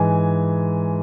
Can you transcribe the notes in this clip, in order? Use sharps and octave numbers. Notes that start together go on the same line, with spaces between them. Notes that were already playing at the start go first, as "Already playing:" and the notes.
Already playing: G#2 E3 G#3 G#5